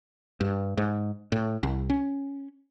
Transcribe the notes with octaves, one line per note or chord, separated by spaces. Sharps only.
G2
G#2
A2
C2
C#4